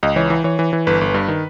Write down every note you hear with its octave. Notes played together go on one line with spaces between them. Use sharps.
C#2 D#5
E3 C#5
E3
E3 C#5
E3
E3
G1 B4
G1
G2
D#3